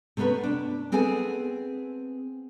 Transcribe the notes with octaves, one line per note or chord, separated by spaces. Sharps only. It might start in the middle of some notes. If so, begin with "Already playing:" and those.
C3 A3 B3 C#4 B4
D4
B3 C4 G#4 A4 G#5